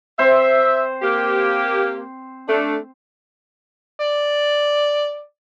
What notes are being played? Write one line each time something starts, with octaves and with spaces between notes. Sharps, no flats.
C4 C5 E5
A#3 G4
A3 D4
D5